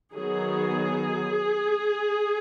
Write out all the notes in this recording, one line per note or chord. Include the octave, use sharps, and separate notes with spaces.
D#3 F#3 B3 G#4